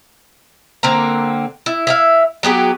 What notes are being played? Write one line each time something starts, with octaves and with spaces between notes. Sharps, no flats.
D3 A#3 C4 A#5
E4
E4 E5 F5
F#3 B3 G4 G#4